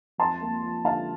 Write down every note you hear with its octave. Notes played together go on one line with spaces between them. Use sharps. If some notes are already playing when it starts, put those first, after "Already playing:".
F2 A5 C6
A#3
F3
D3 F5 A5